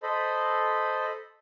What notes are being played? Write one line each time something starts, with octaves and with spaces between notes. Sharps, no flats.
A4 C5 D#5 B5